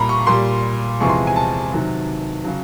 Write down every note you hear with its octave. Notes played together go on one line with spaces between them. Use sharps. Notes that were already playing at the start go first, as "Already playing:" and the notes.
Already playing: A#2 G3 A#5 B5
C#6
A#2 G3 C6
E2 C3 F3 G#3 C#6
C6
G#5
A5
C3 D#3 F#3
C#3 F#3